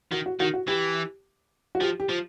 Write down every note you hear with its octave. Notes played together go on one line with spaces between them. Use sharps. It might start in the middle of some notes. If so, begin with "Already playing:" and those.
D#3 F#4
F#4
D#3 F#4
F#4
E3 G4
F#4
F3 G4
G4
F3